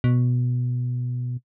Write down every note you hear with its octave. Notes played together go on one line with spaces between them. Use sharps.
B2